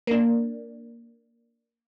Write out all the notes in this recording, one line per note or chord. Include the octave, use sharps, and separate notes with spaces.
A#3 D4